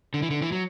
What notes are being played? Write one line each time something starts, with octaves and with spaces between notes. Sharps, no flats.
D3
E3
D3
E3
F#3